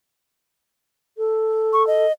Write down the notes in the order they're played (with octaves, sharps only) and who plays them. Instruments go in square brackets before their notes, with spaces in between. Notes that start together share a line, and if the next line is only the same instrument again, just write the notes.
[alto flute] A4
[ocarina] C#6
D#5